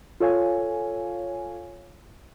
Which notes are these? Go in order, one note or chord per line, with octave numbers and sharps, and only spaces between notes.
F4 A4 C#5 F5 G#5